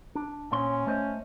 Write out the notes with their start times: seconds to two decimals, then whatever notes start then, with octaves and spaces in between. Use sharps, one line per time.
0.15 D4
0.52 A#2 C#4 C5 C6
0.87 A3 C5 D#5